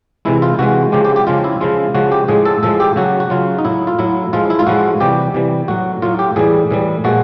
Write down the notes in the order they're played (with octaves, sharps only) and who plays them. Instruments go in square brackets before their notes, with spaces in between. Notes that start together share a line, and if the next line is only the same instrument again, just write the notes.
[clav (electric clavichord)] C3 E3 G#3 E4
F4
C3 E3 G#3 F#4
C#3 F3 G#3 G4
G4
G4
C#3 F3 G#3 F4
E4
C#3 F3 G#3 F4
C#3 F3 G#3 F#4
G4
A2 F3 G#3 G#4
A4
A2 F3 G#3 A4
G4
C#3 F#3 F#4
F#4
C#3 F#3 F4
D#4
A2 F#3 E4
F4
A2 F#3 E4
A2 F3 G#3 F4
E4
F4
A2 F3 G#3 F#4
C3 E3 G3 G4
C3 E3 G3
A2 F#3 F#4
A2 F#3 F4
G4
A2 E3 G3 G#4
A2 E3 G3
A#2 F3 G#3 F#4